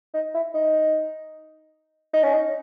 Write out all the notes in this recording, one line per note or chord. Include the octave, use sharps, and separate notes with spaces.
D#4
E4
D#4
D#4
C#4
D#4